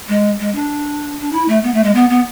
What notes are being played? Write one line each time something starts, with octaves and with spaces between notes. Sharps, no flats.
G#3
G#3
D4
D4
E4
A3
B3
A3
G#3
B3
B3